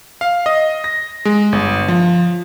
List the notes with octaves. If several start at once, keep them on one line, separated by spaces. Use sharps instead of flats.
F5
D#5
A#6
G#3
G1
F3